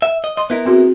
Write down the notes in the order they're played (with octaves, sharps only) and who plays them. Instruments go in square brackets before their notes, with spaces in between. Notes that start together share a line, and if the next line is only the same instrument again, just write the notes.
[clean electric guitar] E5
D#5
[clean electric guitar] D#5 [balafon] C6
[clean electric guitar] B3 E4 A#4
[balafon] C4 F#4 G#4